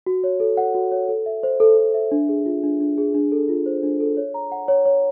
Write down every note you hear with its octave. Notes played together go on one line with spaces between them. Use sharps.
F#4
C#5
A4
F#5
F#4
C#5
A4
E5
C5
A4
A4
E5
D4
G#4
F4
D4
D4
G#4
D4
A4
F4
C5
D4
A4
C#5
A#5
F#5
C#5
C#5